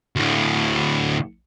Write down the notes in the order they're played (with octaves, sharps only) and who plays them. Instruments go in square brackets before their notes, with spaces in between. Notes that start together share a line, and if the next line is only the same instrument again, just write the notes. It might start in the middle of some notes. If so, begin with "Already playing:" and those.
[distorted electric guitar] D2 A2